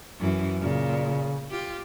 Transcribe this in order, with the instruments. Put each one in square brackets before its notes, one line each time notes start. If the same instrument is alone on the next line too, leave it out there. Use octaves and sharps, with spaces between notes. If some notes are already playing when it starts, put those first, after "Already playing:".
[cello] F#2 E3
[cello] A#2 [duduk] C#3
[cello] F4 G4